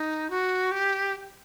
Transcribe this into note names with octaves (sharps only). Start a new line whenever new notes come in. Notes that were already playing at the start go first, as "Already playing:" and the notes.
Already playing: D#4
F#4
G4